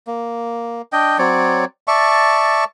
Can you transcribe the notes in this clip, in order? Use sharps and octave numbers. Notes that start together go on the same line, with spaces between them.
A#3
D4 D#5 G5
F#3 C4 C#5 D5
D5 E5 A5 C#6